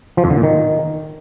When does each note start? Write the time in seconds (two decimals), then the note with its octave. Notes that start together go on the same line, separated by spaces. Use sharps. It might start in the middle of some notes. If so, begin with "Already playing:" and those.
0.17 F3
0.24 F2
0.30 D3
0.37 A#2
0.43 D#3